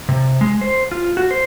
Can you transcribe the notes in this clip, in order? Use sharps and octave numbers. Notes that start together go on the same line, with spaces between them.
C3
G#3
C5
F4
F#4
C5